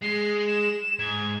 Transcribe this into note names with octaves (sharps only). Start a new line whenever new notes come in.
G#3 C7
E7
G#2 G#6